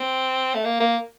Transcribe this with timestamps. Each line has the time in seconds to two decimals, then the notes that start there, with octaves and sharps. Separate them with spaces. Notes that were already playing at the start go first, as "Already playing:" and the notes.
Already playing: C4
0.54 A3
0.64 A#3
0.80 A#3